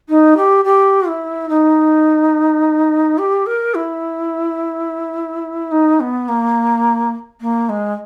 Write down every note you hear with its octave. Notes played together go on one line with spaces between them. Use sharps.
D#4
G4
G4
E4
D#4
G4
A#4
E4
D#4
B3
A#3
A#3
G#3